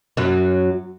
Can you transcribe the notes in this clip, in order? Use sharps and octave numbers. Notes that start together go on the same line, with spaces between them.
F#2 F#3